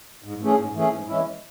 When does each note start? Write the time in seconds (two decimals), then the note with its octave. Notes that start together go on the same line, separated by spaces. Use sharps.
0.24 G#2
0.41 E3 A3 C#4 G#4
0.58 G#2
0.75 E3 A3 C#4 G#4
0.93 G#2
1.08 E3 G#3 C#4 E4